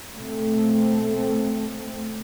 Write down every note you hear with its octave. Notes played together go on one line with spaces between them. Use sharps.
B2 A3 C4